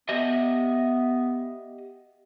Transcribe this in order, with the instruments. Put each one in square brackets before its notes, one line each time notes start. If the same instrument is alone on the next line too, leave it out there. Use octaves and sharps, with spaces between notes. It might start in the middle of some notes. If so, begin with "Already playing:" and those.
[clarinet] B3 [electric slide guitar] G4 D#5 E5